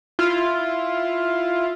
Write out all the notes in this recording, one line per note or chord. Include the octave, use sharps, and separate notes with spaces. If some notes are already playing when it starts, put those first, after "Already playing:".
E4 F4